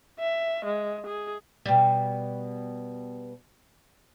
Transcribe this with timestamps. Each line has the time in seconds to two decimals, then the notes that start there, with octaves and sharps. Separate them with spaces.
0.19 E5
0.65 G#3
1.06 G#4
1.66 B2 G3